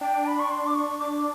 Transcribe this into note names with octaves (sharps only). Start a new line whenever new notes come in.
D4 G5
B5
C#6
C6
D6
C#6
D6